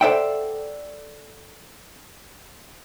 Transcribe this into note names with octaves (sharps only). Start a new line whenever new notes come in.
A4 C5 D5 E5 F#5 G5